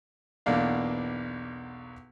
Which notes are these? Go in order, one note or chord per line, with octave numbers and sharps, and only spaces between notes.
B1 E2 B2 A#3 D4 F5